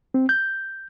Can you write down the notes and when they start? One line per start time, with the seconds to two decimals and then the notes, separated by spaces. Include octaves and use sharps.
0.14 C4
0.29 G6